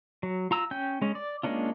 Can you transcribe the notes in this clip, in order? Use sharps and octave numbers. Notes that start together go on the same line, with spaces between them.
F#3
F4 A#5 E6
C#4 G5 G6
G#3 C#4
D5
G#3 A#3 C#4 D4 F4